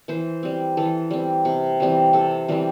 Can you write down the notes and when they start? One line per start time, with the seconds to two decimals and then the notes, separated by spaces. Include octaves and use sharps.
0.08 E3 C5
0.43 G3 C4
0.77 E3 A4
1.11 G3 C4
1.45 C3
1.80 E3 G3 C4
2.13 C3 A4
2.48 E3 G3 C4